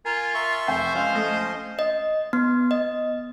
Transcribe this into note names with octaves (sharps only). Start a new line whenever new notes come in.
F4 A#4 G#5
E5 C6 C#6
F1 C5 G5 G#5
F3 G#3 C#4 F5
A3 D#5
D#5
B3
D#5